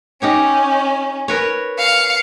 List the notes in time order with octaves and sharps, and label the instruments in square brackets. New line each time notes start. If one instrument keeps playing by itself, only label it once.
[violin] C#4 [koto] D#4 G4 C#5
[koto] A#4 B4 C#5
[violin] F5 C#7